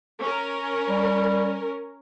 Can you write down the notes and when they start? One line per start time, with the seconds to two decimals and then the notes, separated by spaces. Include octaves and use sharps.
0.20 C#4 A#4
0.89 G3